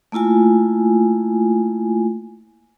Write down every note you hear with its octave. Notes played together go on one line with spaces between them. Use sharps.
A3 A#3 E4 F4 G#5